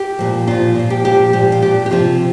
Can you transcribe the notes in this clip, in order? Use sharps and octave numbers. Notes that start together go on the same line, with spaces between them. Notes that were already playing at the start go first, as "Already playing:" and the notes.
Already playing: G4
A#2 F3
A#2 F3 F4
A#2 F3
G4
A#2 F3 G4
A#2 F3 G4
F4
A#2 F3 G4
G4
C3 F3 F4